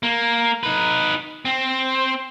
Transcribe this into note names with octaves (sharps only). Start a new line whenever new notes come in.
A#3
D#4 B4
C4